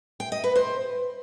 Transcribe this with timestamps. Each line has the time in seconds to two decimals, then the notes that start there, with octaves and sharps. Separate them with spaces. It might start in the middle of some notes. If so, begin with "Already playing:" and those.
0.20 G5
0.32 D#5
0.44 B4
0.56 C5